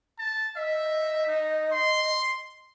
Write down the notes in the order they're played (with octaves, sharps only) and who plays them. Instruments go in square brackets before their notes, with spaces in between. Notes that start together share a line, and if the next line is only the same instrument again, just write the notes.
[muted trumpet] A5
[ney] D#5 [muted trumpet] E5
[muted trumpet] D#4
C6